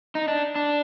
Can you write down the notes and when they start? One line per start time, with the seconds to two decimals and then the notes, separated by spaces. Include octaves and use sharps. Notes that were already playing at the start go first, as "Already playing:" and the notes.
0.15 D#4
0.28 D4
0.55 D4